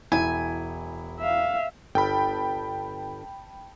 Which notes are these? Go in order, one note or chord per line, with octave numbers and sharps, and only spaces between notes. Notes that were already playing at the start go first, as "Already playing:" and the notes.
E1 E4 G#5
E5 F5
G1 G5 A5 B5